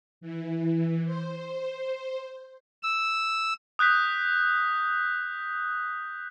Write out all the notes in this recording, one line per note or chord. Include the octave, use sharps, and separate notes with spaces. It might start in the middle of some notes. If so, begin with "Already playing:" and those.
E3
C5
E6
D#6 F#6 G6 B6